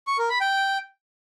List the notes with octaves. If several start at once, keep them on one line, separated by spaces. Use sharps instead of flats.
C#6
A#4
B5
G5